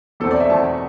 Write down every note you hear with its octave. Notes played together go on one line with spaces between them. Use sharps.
E2 B2 A3 C4 A4
D5
E5
E2 B2 A3 C4 A5